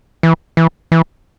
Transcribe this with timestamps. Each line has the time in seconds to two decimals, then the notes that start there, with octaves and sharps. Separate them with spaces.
0.23 E3
0.57 E3
0.92 E3